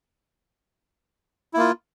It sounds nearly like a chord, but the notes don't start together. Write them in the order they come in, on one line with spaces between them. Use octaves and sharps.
E4 A#3 F4